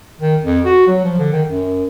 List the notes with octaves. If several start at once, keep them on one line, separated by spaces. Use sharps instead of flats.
D#3
F2
F#4
F#3
F3
D3
D#3
F#2